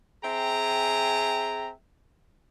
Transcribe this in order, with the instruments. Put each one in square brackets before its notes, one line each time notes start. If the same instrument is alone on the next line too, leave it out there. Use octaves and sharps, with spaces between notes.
[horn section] C4 G#4 E5 G5 G#5 A#5